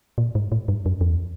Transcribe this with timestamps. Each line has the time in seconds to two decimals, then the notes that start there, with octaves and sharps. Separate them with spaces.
0.18 A#2
0.35 G#2
0.52 A2
0.68 G2
0.86 F#2
1.01 F2
1.08 E2